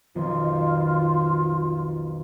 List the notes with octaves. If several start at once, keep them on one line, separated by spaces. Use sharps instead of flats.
B1 F2 D#3 F4